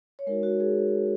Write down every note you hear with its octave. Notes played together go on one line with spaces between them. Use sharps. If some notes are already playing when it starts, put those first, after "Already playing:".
C#5
G#3 D#4 F#4 A#4
F#4
G#4